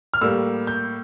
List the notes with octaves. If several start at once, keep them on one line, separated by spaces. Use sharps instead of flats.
F6
A2 G3 A#3 E6
G6